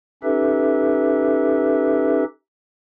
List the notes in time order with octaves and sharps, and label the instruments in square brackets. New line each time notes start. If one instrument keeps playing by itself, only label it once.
[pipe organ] C#4 D#4 G4 A4 B4 E5